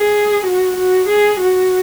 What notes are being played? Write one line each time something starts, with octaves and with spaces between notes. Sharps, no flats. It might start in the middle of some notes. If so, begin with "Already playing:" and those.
Already playing: G#4
F#4
F#4
G#4
F#4